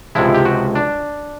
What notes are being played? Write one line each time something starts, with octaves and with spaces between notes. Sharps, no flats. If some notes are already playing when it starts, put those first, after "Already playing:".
C#2 C3 F3 G#3 E4
G4
F#4
D4